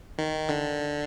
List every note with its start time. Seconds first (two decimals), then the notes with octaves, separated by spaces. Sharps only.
0.18 D#3
0.49 D3